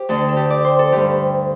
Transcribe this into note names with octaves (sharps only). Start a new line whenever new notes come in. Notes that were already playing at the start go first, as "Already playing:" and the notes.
Already playing: G4 C5
D2 D3 A4
A4
G4
D5
C5
A4
G2 D3 G4